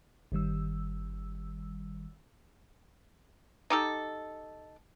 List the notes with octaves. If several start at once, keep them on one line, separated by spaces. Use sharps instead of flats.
G1 D#3 G3 E6
D#4 G4 A4